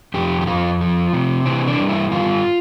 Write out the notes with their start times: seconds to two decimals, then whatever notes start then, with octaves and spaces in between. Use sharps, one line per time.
0.14 F2 G4
0.41 G4
0.47 F2 F4
0.81 F3
1.13 C3
1.46 E3 C4
1.67 D4
1.79 G2
1.89 E4
2.11 G2 F4